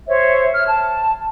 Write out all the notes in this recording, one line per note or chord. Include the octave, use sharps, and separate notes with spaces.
C5 C#5 E5
F6
A5